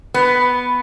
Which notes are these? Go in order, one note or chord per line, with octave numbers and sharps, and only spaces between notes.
B3